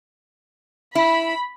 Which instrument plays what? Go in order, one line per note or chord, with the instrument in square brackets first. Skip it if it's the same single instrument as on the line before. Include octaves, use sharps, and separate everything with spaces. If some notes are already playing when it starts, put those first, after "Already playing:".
[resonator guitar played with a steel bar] E4 [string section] B5